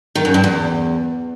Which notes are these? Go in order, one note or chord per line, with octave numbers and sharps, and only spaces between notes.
D#3
F#2
G2
E2